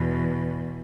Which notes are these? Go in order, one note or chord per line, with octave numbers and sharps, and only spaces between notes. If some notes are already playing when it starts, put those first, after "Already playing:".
Already playing: E2 B2